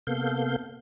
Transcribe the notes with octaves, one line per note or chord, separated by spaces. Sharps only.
C3 A#3 B3 A4 F5 G6